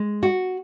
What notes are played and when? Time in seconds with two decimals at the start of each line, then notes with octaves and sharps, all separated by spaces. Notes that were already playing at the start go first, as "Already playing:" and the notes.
Already playing: G#3
0.23 F#4